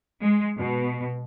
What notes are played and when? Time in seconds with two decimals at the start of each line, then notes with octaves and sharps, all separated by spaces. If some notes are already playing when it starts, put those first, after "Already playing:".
0.22 G#3
0.57 B2